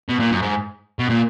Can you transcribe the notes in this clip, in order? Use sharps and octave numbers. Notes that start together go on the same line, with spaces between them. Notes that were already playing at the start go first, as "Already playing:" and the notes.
B2
A#2
F#2
G#2
B2
A#2